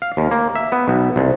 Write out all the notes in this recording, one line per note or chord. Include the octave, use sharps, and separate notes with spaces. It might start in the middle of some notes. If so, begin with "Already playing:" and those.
F5
D#2
A#3
E5
B3
B1
C2